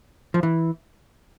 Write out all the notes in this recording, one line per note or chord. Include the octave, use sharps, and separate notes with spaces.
F3
E3